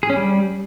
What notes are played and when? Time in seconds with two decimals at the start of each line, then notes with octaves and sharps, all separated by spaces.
0.03 G#4
0.10 C#4
0.16 G3